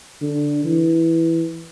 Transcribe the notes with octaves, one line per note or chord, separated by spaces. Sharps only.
D3
E3